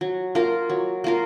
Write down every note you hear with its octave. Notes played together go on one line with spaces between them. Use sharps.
F#3
A#3 F4 A#4
F#3
A#3 F4 A#4